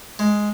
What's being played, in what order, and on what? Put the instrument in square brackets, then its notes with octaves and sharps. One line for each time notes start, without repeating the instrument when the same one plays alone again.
[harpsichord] G#3